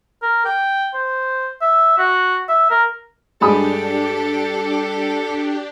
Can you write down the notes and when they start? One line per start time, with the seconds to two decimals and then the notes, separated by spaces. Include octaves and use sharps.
0.22 A#4
0.45 G5
0.94 C5
1.61 E5
1.99 F#4
2.49 E5
2.70 A#4
3.41 G2 G#3 D4 G4 A4 B5 D#6